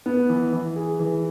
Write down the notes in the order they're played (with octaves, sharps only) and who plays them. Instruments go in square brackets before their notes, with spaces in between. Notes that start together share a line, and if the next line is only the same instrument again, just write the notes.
[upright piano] B3
E3
E3
G#4
E3